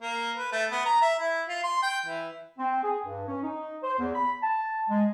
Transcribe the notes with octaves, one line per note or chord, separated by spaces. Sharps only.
A#3
B4
A3
B3
A#5
E5
E4
F4
C6
G5
E3
C4
G#4
G2
C#4
D#4
C5
E2
B5
A5
G#3